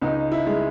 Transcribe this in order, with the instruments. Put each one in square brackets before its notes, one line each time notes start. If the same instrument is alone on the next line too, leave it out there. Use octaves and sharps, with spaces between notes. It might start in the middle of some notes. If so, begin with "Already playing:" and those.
[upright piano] C#2 D#4
E4
G#3